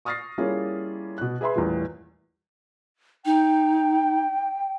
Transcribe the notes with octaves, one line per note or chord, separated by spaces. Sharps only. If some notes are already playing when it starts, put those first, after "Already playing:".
C#6 D#6 F6 A6 A#6 C7
G3 A#3 C#4 E4 F4 G#4
B2 F#6
G#4 B4 E5 B5 C6
A1 E2 A#2 E3 G3
D#4 G5